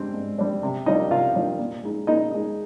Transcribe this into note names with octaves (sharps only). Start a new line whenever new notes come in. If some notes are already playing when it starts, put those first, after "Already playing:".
Already playing: G#2 G3 C4 D4
G#2
G3 D4
C3
D#3 G3 D4 D#4 F4 D#5
C3 F4 F5
D#3 G3 D4 F4
A#2
G#3 D#4
A#2 D#4 D#5
G#3 D#4